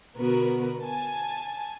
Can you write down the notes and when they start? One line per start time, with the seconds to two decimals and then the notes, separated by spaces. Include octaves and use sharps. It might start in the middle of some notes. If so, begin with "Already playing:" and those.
0.17 B2 D3 B3 F#4 A#4 B4
0.82 G#5 A5